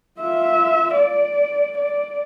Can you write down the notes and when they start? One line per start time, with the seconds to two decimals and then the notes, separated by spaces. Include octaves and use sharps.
0.20 F4 E5
0.94 D5
1.78 D5